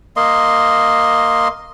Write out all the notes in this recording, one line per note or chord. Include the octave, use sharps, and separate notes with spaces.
A#3 D#5 C6